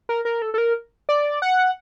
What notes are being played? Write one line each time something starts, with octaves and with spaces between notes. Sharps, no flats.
A#4
A#4
A4
A4
A#4
D5
F#5